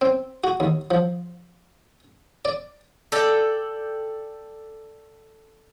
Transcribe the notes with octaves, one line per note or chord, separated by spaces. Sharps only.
C4
F#4
D#2
F3
D5
A4 D5 G5